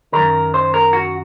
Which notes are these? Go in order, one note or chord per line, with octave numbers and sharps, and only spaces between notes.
F#2 D#3 A#4
C5
A#4
F#4